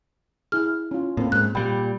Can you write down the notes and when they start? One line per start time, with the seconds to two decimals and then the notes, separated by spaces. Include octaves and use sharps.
0.52 E4 G#4 F6
0.91 C#4 F4
1.17 A2 A#3 C4 C#4
1.32 G#2 F#6
1.55 A#2 G3 G5 B5